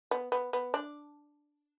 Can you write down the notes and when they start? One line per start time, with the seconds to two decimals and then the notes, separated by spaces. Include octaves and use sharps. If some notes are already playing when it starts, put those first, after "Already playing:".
0.11 B3
0.32 B3
0.53 B3
0.74 D4